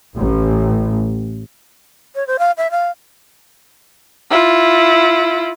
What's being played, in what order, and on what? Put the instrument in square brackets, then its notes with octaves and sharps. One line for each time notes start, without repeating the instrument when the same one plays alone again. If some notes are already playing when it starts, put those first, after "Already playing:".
[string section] A1
[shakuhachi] C#5
C5
F5
E5
F5
[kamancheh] E4 F4